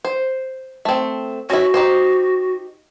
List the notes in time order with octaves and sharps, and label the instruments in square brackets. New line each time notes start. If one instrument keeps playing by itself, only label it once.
[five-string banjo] C5
A3 C4
[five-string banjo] C#4 E4 [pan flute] F#4
[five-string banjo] D#4 G4 C5